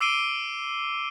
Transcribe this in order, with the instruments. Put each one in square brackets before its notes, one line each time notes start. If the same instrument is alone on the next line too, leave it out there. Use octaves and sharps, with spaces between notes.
[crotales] D6 E6 C7 D7 D#7 G7